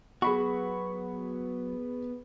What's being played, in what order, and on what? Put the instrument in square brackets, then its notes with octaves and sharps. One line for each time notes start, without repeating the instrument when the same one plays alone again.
[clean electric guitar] F#3 F#4 [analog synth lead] B3 [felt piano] G#4 B5 C#6